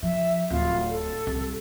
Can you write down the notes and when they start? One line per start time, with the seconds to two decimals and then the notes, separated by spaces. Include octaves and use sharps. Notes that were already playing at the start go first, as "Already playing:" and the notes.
0.03 F3 E5
0.50 D1 F4
0.90 A4
1.27 C2